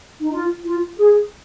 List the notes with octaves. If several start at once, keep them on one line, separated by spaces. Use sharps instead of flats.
D#4
F4
F4
G#4